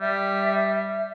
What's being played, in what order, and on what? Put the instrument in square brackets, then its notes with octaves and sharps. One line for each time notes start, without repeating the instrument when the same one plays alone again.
[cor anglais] G3 [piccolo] E5